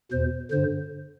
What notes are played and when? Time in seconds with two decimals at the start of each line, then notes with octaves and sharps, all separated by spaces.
0.12 E2 B2 C5
0.51 G2 D3 C5